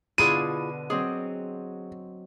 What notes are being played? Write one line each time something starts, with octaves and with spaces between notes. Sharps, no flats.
B2 D3 E4 F4 G#4 D#7
F#3 C4 G#4 D#5